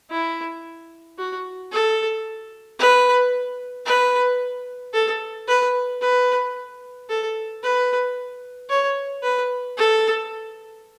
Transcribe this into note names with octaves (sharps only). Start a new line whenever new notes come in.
E4
F#4
A4
B4
B4
A4
B4
B4
A4
B4
C#5
B4
A4